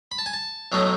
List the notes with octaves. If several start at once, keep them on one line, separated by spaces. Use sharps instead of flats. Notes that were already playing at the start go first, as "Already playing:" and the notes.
B5
A5
G#5
A5
B1 A2 F#3 A3 D#4